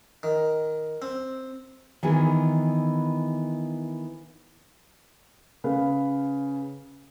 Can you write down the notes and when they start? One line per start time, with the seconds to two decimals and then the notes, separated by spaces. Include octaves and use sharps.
0.23 D#3
1.02 C4
2.03 D#3 E3 B3 G#4 B4
5.64 C#3 B4 F5